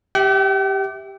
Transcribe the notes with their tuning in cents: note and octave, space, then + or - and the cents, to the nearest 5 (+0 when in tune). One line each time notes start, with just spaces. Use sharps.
G4 +0 E5 -15 G5 -45